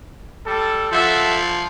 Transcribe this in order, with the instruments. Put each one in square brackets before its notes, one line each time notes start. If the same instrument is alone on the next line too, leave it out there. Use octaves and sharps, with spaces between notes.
[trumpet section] G3 A4
[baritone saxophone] F3 [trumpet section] A4 E5 F#5